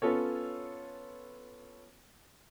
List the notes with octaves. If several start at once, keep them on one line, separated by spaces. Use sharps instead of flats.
B3 C#4 F4 A4 C#5